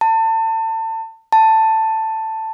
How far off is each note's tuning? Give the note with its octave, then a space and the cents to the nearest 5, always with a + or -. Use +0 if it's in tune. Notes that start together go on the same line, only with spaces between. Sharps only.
A5 +30
A5 +10